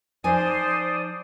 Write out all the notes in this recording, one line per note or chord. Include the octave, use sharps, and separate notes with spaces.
F3 D#4 C5 D5 G#5 D#6